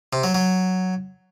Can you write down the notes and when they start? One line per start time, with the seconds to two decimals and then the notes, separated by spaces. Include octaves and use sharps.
0.13 C3
0.24 F#3
0.35 F#3